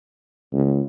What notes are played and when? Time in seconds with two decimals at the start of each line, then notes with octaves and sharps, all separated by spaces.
0.53 C#2